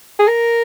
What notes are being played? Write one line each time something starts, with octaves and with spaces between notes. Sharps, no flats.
G#4
A#4